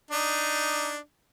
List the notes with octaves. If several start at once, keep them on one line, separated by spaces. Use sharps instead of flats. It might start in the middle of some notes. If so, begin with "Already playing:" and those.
D4 D#4